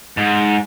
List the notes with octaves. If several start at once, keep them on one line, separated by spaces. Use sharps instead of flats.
G#2